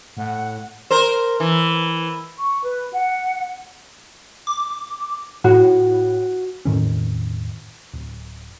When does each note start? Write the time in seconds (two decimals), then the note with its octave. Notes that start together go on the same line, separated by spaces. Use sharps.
0.17 A2 F#5
0.91 A#4 C5
1.40 E3
2.37 C#6
2.63 B4
2.94 F#5
4.47 D6
5.44 A2 F#4
6.65 E1 A2 D#3 C#4
7.93 D1